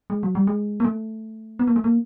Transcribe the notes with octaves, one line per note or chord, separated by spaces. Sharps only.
G#3
F#3
G3
G#3
A#3
A3
B3
A#3
A3
A#3